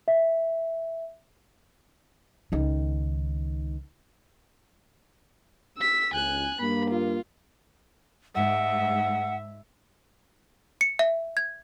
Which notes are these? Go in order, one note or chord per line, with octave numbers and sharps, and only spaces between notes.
E5
C#2 D#3
E6 B6
C#2 G#5 F#6
G2 A#3 B5
F4
G#2 E5 F#5
C#7
E5
G#6